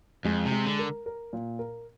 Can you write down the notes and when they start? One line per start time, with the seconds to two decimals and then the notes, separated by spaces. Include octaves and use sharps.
0.25 F2 G#3
0.46 C3
0.52 G#3
0.66 D3
0.79 A#4
1.06 A#4
1.33 A#2
1.59 A#4